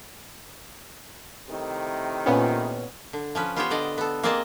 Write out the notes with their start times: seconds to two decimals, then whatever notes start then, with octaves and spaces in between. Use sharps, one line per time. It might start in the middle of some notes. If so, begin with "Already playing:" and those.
1.49 A2 C3 D#3
2.26 A#2 B3 C#4
3.13 D3
3.35 F3 C#4 B4
3.56 B3 F4 G4 C5 C#5 G5
3.71 D3 D5 D#5
3.98 B3 A4
4.23 A#3 C4 G#4 D5 D#5 A5